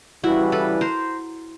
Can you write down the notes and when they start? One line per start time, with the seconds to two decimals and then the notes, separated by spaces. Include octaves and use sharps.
0.24 C#3 E3 G3 E4 F#4
0.52 A4 B4
0.81 A#4 C5